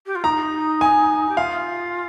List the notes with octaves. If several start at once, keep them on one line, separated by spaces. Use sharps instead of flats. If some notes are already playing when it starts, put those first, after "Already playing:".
G4
F4
D#4 A#5
G#5
G4
F4 F5